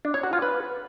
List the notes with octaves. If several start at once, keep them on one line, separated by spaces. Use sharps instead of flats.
D4
C#5
F#4
F4
B4